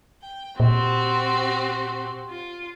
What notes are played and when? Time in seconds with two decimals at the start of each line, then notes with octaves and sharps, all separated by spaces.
0.22 G5
0.60 A#2 C4 F#4 G4
2.30 F4